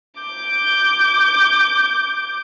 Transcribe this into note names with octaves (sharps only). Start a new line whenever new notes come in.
D6 G6